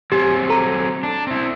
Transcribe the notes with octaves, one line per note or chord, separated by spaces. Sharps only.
F#3 C4 G4 G#4
A4 A#5
D4
C4 E4